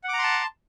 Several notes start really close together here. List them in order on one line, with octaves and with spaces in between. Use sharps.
F#5 D6 A#5 C6 A5